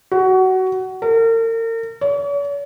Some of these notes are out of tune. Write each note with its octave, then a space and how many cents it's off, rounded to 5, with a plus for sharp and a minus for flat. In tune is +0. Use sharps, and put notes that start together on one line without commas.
F#4 +20
A#4 -40
C#5 +45